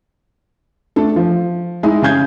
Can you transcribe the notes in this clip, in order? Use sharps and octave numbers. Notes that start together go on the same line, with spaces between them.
A3 D4 A4
F3
G#3 D#4 E4
C#3 G#5 G6 G#6